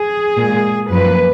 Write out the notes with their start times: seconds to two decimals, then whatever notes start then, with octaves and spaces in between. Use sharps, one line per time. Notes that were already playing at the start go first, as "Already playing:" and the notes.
Already playing: G#4
0.38 A#2 G#3
0.89 F#2 F3 A#3 B4